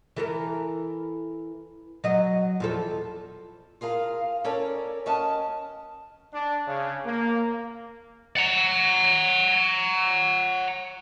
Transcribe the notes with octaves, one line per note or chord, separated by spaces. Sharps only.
E3 A4 A#4
F#3 D#5
E2 F3 A4
F4 G#4 A#4 F5
C#4 A4 A#4 C#5 D5
C#4 F#4 A#4 D#5 F#5 A5
D4
C#3
A#3
F#5 A#5